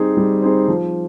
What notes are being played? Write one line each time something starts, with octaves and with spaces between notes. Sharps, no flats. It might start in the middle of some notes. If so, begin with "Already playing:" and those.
Already playing: G3 C4 D#4 G#4 C5
G3
C4 D#4 G#4 C5
F3